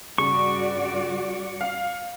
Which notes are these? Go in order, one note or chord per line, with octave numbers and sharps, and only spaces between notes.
G2 C#3 F#4 D5 C#6
F5